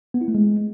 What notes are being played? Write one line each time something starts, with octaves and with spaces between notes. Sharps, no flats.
B3
E4
A3
G#3